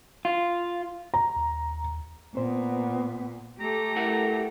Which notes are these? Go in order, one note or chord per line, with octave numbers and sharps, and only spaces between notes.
F4
A#5
D#2
A#2 B3 C4 C5
A3 G4 A4 A#5
E4 A#4 F#5